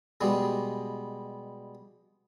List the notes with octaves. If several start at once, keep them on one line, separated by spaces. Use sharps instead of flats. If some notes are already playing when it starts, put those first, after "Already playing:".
B2 G3 G#3